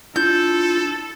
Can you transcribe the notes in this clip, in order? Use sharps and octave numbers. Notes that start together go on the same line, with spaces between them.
D4 E4 F4 A4 G6